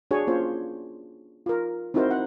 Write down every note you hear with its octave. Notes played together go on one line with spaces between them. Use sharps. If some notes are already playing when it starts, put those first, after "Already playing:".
D4 F#4 G#4 C#5 G#5
A#3 C#4 F4 C5 C#5
F4 A#4
C4 D#4 E4 F#4 A#4 C5
F#5